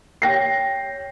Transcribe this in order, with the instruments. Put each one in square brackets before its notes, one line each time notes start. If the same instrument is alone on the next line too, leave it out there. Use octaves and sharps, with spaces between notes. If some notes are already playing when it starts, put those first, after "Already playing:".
[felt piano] C#5 G5 A#6 C7